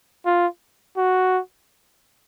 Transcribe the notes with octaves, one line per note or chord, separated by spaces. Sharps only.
F4
F#4